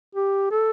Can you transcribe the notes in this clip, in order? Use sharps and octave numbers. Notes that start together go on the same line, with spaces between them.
G4
A4